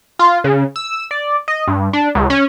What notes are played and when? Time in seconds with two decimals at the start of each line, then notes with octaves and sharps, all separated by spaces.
0.19 F4
0.44 C#3
0.76 E6
1.11 D5
1.48 D#5
1.68 G2
1.93 D4
2.15 C#2
2.30 C#4